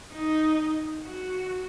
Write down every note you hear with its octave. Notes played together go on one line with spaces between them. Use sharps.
D#4
F#4